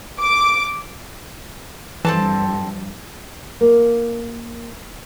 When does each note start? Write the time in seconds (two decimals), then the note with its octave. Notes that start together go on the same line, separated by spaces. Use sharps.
0.21 D6
2.05 G2 E3 F3 C4 A4 A5
3.61 A#3